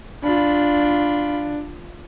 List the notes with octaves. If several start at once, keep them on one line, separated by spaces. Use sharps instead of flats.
D4 F4 B5